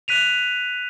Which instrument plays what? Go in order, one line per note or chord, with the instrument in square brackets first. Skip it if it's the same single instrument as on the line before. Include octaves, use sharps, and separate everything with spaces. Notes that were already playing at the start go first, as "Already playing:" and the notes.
[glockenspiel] F#6 B6 D#7 F7